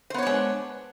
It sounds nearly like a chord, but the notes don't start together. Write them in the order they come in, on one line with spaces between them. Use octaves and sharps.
C5 B3 C#5 D4 G#3